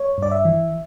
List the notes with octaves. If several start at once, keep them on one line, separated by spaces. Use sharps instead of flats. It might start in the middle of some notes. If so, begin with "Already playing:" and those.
Already playing: C#5
G2 D5
E5
E3